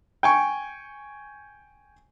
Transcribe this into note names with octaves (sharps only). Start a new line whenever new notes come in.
G5 G#5 C#6